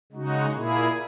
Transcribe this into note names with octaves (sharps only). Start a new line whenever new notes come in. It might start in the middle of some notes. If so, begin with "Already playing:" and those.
C#3 G#3 D#4 F#4
A#2 A#3 E4 G#4